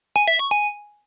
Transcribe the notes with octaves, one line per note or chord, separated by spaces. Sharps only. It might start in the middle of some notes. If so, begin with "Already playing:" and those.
G#5
E5
C#6
G#5